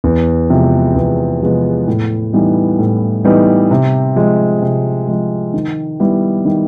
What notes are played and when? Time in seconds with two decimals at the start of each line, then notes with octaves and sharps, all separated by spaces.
0.04 E2
0.50 C3 F3 G#3 B3
0.96 E2
1.41 C3 F3 G#3 B3
1.88 A2
2.33 E3 G3 B3 D#4
2.79 A2
3.25 E3 G3 B3 D#4
3.71 C3
4.16 F3 G#3
4.62 C3
5.08 F3 G#3
5.54 D#3
6.00 G3 B3 E4
6.45 D#3